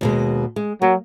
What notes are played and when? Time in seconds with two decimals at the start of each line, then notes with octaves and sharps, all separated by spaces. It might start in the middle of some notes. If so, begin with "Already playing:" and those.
0.01 D#2 B2 G#3
0.56 G#3
0.82 F#3 A#3